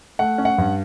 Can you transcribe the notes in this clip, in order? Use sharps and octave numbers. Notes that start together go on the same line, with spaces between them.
A3 F#5
C#4
F#5
G2